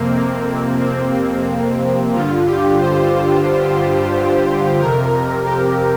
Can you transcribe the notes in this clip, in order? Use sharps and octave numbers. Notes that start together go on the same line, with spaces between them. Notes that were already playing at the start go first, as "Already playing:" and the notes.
Already playing: F2 C3 A#3 C4
A#3
C4
G2 D3 F4
G4
C5
F2 C3 A#4
G4